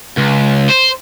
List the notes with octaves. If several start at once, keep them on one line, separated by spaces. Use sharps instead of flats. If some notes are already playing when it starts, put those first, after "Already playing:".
C#2
C5